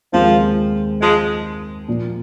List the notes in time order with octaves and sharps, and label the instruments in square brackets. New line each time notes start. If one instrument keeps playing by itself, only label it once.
[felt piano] D#2 D#3 G#3 C4 [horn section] F3
[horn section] F3 G#3
[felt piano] A#2 F3 A#3